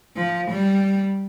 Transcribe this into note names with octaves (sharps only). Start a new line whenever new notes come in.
F3
G3